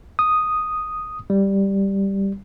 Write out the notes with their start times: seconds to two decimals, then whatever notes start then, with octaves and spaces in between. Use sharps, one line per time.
0.19 D#6
1.30 G3